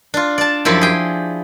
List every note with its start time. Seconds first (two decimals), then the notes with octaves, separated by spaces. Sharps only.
0.14 D4 F4
0.38 D5 A5
0.65 F#2 F3 E4 G4
0.81 G#4 G5